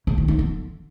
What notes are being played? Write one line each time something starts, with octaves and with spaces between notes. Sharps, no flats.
C#3
D#3
D#4
D3